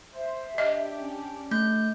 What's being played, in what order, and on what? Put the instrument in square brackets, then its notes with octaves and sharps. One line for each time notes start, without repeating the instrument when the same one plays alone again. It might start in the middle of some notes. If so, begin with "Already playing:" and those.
[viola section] C5 [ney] E5
[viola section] D4 G4 [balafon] D#5
[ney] C#4
[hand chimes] A3 G6